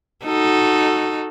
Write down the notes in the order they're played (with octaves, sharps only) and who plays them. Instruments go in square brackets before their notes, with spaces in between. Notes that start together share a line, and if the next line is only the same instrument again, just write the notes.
[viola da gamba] D#4 F#4 A4